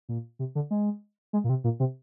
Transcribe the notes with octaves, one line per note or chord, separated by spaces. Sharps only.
A#2
C3
D3
G#3
G#3
A#2
C3
A#2
C3